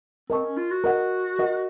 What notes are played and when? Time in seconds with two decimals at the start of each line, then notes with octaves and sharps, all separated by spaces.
0.30 C4 A#4 D#5 A5 C#6
0.44 C#4
0.57 F4
0.71 F#4
0.84 A#4 D#5 F#5
1.39 A#4 D#5 F#5